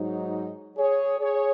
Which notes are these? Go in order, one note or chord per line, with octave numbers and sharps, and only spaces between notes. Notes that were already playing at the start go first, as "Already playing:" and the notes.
Already playing: G#2 F#3 D#4
G#4 C#5
G#4 C#5